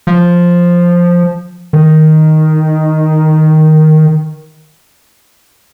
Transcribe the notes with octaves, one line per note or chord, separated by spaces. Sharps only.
F3
D#3